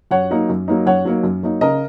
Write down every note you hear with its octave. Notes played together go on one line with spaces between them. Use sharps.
F#2 C#5 F#5
F#3 A#3 D#4
F#2
F#3 A#3 D#4
F#2 C#5 F#5
F#3 A#3 D#4
F#2
F#3 A#3 D#4
C#3 A#4 D#5